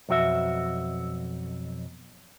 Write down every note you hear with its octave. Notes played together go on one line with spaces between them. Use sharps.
B1 F2 F#4 E5